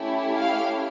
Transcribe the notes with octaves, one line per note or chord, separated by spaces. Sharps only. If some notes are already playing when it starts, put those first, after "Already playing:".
Already playing: A3 C#4 E4 G4
F5